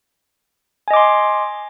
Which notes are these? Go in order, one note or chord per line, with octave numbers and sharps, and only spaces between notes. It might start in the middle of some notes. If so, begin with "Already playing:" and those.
D#5 G#5 C6 D6